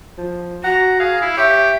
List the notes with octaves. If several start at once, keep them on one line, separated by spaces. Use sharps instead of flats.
F3
F#4 F#5 A#5
G#4 F5
E4
G4 C#5 E5